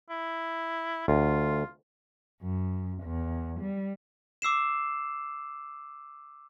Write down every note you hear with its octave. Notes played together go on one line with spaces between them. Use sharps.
E4
D2 F4
F#2
E2
G3
D6 E6 C7 E7